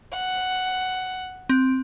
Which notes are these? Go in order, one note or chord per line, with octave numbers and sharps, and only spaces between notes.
F#5
C4